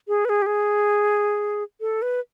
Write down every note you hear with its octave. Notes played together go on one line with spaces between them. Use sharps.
G#4
B4
G#4
G4
G#4
A4
B4